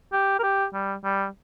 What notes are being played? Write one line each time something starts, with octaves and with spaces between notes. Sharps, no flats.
G4
A#4
G4
G3
G3